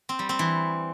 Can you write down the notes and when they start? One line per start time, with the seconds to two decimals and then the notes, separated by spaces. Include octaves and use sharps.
0.09 C4
0.19 G3
0.29 C4
0.39 E3